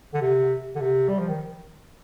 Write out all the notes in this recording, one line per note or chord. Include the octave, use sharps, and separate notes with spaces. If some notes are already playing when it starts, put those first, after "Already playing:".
D3
C3
D3
C3
G3
F3
D#3